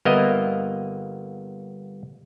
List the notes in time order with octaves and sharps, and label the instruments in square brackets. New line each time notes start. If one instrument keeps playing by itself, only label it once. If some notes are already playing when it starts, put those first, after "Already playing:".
[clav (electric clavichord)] G1 A#3 B3 A#4 D#5 E5